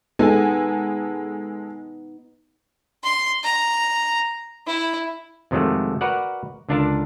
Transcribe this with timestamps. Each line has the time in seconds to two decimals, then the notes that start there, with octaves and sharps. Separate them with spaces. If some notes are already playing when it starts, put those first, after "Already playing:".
0.19 G#3 B3 D#4 A4 G#5
3.04 C6
3.43 A#5
4.66 E4
5.51 F2 C3 D#3 F#3 G#3 A3
6.01 F#4 A#4 B4 D5 F#5
6.69 C#2 D3 D4 F4 A#4 A5